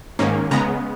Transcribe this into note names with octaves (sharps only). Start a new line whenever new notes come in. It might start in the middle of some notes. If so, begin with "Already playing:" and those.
G#2 D#3 A#3 C#4
C#3 G#3 B3 A#5